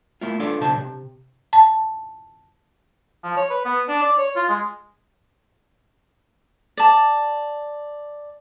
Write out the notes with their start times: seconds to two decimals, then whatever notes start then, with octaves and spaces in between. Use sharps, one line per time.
0.21 A3 A#3 E4 F4
0.40 D4 F4 A4 D5 F5 C6
0.61 B1 C#3 D4 C5 A5
0.77 C3
1.53 A5
3.23 F3
3.37 C#5
3.50 B4
3.65 B3
3.88 D4
4.02 D5
4.18 C#5
4.36 F4
4.49 G#3
6.77 D5 A5